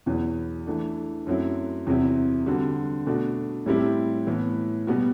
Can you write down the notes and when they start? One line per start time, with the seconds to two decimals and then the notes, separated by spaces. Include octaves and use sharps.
0.06 E2 B2 F#3
0.67 E3 A3 D4
1.27 F#2 F#3 A3 C4 E4
1.87 E2 C3 F#3 C4 E4
2.46 D3 G3 C4 F#4
3.07 B2 A3 D4 F#4
3.66 A2 G3 C4 E4 G4
4.27 A2 E3 B3
4.87 B2 G3 B3 F#4